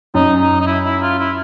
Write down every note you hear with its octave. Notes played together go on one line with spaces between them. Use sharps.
F#2 D#4
D#4
D#4
E4
E4
F4
E4